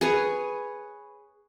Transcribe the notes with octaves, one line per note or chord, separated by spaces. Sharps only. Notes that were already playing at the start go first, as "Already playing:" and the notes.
G#4 B4 C#5